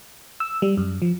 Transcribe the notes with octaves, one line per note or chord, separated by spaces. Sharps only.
E6
G3
F#2
F3